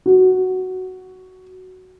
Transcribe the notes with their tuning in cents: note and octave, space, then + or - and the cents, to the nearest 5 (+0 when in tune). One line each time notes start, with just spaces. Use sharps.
F#4 +5